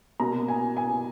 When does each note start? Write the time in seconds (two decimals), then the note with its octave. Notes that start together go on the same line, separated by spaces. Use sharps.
0.20 B2 A#3 A#5
0.48 G#5
0.77 G#5